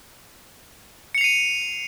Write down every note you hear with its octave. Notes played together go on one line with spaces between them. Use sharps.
C7 C#7 D#7 F7